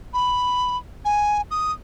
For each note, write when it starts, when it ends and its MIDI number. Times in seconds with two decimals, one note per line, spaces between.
0.14 0.77 83
1.05 1.41 80
1.51 1.72 87